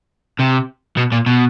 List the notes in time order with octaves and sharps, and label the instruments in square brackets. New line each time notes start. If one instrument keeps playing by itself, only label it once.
[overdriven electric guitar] C3
B2
A#2
B2